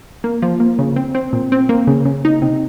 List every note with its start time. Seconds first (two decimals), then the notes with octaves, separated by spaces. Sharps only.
0.24 A#3
0.42 F3
0.60 A#3
0.79 C#3
0.96 C4
1.15 C4
1.33 A#2
1.52 C4
1.69 A#3
1.87 C#3
2.05 C#3
2.25 D#4
2.42 C3